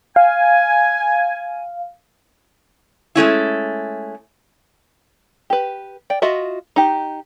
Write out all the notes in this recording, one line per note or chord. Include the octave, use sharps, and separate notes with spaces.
F5 G#5
G#3 A3 C#4 E4
G4 B4
D5 G5
F4 F#4 D#5 E5
D#4 G4